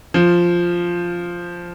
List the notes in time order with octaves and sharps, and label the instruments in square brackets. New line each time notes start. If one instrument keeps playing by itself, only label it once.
[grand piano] F3